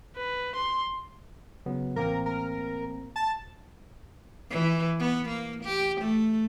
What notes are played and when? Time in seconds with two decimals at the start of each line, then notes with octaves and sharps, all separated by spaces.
0.17 B4
0.55 C6
1.66 C#3 F#3 B3
1.96 A1 A#3 C4 A#4
2.26 A#4
3.16 A5
4.50 E3
5.00 B3
5.28 A#3
5.63 G4
6.01 A3